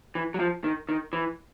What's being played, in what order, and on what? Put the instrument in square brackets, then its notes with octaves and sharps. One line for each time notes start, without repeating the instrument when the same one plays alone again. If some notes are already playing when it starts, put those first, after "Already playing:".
[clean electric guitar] E3
F#3
F3
D#3
D#3
E3